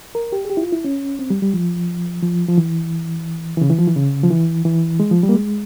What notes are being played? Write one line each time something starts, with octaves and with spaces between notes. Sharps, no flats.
A#4
G4
G#4
G4
E4
F4
E4
C#4
C4
G3
G3
F3
F3
F3
E3
E3
C#3
E3
F3
E3
C#3
F3
E3
E3
G#3
F3
G3
A#3
G#3